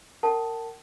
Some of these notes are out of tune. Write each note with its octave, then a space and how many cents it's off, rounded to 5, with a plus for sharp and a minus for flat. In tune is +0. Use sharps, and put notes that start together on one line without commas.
A#4 -25 F#5 +40 A5 +0